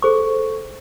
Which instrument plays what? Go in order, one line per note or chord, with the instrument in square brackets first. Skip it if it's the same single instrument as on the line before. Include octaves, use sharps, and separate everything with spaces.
[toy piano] G#4 C5 D6 [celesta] A4 C#6